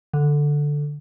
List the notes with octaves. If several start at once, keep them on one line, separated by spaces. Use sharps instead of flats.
D3